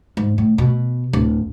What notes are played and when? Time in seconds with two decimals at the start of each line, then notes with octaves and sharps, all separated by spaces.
0.17 G#2
0.38 A2
0.58 B2
1.13 D1